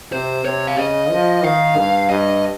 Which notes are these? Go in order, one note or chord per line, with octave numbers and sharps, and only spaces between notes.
C3 C5
C3 C#5
F5
C#3 D#5
F3
D#3 F5
G2
G2 D#5